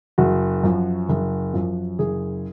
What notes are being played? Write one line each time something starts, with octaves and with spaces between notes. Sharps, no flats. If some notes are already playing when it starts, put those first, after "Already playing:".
F#1 F#4
F#2 F3
F#1
F#2 F3
F#1 G#4